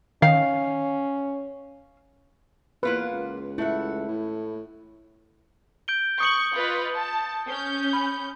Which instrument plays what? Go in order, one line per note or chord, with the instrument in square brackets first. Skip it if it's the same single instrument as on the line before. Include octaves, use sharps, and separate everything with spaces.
[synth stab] D#3 [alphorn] C#4 [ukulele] F5
[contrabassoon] E2 [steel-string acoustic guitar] A#3 F4 F#5 [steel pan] B4
[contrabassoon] C#2
[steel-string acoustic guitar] A3 E5 F#5 [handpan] E4
[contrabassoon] A2
[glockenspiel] G6 D7 G7
[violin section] C#6 [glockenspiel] D#6 C#7 F#7
[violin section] F4 B4 D#5
A5
C#4 G6
[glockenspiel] B5